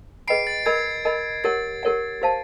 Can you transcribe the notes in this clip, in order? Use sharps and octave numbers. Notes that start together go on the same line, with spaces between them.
G#4 B4 D#5 G5 B5 C7 D7
A6
A#4 D#5 G#5 B5 G#6
A#4 D#5 G#5 B5
G4 A#4 C#5 F#5 A6
G4 A#4 C#5 F#5
G4 C5 F5 A5